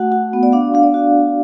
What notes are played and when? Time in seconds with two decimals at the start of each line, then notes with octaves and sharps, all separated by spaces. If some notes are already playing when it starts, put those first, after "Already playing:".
Already playing: A3 F#4 F#5
0.12 F#4
0.33 B3
0.43 D5
0.53 D4 F5
0.74 D4 F5
0.83 D5
0.94 F#4